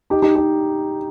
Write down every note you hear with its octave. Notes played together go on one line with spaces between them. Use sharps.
D#4 G4
D#4 G4
D#4 G4